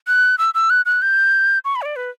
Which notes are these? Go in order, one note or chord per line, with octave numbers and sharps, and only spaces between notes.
F#6
E6
E6
F#6
F#6
G6
C#6
B5
C#5
D5
B4